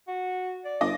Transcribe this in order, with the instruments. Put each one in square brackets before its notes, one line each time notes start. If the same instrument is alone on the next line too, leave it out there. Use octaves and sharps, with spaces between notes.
[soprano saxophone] F#4
D5
[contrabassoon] G1 [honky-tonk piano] D#5 D6